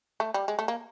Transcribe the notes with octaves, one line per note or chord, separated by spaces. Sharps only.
A3
G3
G#3
A3
A#3